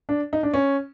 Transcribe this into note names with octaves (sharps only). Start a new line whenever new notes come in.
D4
D#4
D4
C#4